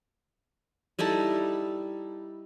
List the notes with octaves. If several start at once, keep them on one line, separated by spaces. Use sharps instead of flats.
G3 D#4 E4 A4